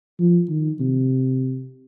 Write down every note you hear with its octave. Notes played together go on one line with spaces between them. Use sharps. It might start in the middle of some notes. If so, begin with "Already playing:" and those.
F3
D#3
C3